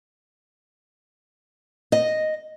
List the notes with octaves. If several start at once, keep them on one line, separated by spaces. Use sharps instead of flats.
D#5